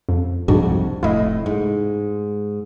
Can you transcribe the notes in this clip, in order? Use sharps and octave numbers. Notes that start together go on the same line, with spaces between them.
F2
C2 F2 G#2 D4 F#4
F1 A2 E4 D#5
G#2